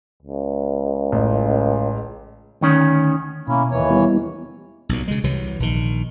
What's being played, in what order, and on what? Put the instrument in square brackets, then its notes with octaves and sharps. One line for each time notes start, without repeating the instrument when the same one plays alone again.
[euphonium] C#2
[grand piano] A1
[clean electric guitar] D2 D#3 C#4
[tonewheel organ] B2 [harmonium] A#3 C#4 E4
[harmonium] D#2 E3 C#5
[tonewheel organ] G3 B3 E4
[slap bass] B1 A#2
C#3 G#3
C2 C3 E3 F#3
A#1 D#3